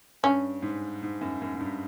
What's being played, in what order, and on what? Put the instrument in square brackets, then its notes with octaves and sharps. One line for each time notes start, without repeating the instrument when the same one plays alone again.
[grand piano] G2 [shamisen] C#4
[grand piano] G#2
G#2
F#2
F#2
F#2
G2